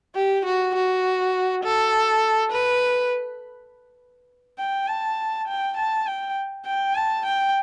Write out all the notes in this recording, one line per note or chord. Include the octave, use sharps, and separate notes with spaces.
G4
F#4
F#4
A4
B4
G5
A5
G5
A5
G5
G5
A5
G5